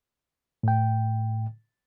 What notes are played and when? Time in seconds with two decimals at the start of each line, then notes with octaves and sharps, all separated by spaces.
0.63 A2 G5